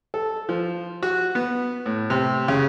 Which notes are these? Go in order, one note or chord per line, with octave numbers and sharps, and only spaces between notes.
A4
F3
F#4
B3
A2
C3
C#3